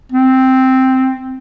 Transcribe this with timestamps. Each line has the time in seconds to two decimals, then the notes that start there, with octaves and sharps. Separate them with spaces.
0.12 C4